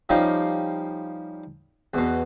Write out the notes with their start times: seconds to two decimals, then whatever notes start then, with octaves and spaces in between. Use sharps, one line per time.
0.09 F3 G3 C#4 D#4 F4 G4
1.94 E2 B2